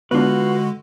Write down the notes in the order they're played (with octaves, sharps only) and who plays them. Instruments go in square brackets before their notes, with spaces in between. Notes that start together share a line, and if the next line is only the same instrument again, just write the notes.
[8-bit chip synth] D3 G#3 [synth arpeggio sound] B3 D4 [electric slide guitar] F4 B4 [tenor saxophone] F#4